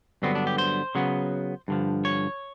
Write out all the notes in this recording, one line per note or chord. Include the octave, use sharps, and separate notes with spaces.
G2 D3 F#3 B3 C4
D4
G4
C5
C#3 F#3 B3
G2 D3 F3
C#5